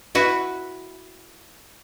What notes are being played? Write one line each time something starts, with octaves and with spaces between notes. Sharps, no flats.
E4 F#4 B4